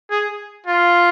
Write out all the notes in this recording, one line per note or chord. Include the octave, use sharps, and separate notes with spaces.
G#4
F4